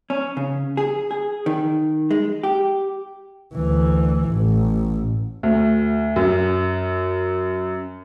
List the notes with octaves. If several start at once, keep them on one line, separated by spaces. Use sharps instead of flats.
C#4
C#3
G#4
G#4
D#3
G#3
G4
D2 E3
A1
D2
F#2